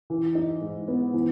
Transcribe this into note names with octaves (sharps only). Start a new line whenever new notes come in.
E3
D#4
G#2
B3
E3